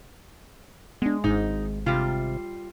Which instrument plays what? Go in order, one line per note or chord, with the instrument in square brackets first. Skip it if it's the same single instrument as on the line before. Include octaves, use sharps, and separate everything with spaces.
[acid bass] G#3 [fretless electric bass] B3 D4
[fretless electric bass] G#1 G#2 [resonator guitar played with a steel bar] D#4
[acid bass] C3 [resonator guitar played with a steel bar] G3 F4